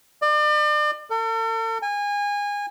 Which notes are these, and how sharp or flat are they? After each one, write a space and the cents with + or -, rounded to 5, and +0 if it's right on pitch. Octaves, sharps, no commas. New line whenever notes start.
D5 +40
A4 +45
G#5 -25